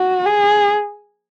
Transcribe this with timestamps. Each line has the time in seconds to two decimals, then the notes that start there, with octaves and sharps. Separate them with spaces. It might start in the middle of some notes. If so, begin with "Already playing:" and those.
Already playing: F#4
0.26 G#4